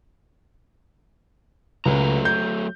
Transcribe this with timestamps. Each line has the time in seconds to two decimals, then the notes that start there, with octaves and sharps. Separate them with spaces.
1.85 C#2 F#3 A3 A#5
2.25 G6